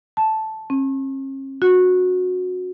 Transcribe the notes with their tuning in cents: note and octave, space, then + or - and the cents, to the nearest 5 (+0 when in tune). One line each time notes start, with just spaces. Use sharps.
A5 -5
C#4 -45
F#4 -20